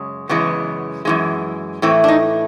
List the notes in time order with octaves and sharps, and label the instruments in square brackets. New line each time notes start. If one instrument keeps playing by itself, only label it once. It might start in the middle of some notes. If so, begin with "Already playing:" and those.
Already playing: [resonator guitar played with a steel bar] F#2 C#3 G#3
F#2 C#3 E3 G#3 B3
F#2 C#3 E3 G#3
A2 E3 A3 C4
D4
D#4